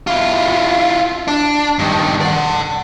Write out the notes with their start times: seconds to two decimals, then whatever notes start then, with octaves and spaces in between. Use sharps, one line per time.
0.07 E4 F4
1.28 D4
1.79 G2 D#3
2.21 D5 F#5